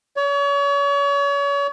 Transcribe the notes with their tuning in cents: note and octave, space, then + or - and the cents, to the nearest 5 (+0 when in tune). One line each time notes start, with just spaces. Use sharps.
C#5 +35